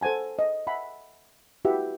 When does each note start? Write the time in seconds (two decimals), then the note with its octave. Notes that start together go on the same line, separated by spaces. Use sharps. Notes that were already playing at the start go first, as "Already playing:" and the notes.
0.01 A4 C5 F#5 G#5 A5
0.39 D#5
0.67 E5 F#5 G#5 B5
1.65 E4 F#4 G4 B4 E5 F#5